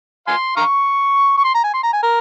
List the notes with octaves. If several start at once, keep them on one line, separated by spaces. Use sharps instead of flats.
F5 G#5 C6
F5 A#5 C#6
C#6
C6
A#5
G#5
C6
A#5
G#5
A#4